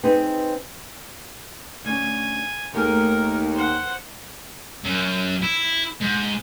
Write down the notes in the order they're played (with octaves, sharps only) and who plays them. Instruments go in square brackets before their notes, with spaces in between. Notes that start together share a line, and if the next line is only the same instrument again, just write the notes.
[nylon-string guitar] C4 D#4 G#4 B4 C5
[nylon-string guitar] D2 C#4 [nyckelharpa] G#5
[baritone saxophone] D#2 [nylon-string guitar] D#3 A3 G#4 [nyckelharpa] A#4
[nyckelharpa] C5 F#5
[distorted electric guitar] F#2
E4
G#2